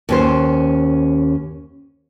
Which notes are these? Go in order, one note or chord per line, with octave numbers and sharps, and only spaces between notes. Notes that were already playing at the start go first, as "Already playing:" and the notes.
D#2 C#4 C5